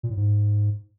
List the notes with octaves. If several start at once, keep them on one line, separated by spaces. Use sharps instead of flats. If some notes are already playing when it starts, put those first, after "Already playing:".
A#2
A2
G#2